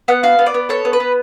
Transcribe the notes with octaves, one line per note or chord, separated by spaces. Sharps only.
B3 F#5
F#4 F5
B3
D5
B3
A4 C#5
B3
B4
B3